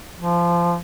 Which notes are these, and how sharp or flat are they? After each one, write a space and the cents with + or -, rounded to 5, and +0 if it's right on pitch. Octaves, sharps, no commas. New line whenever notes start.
F3 -20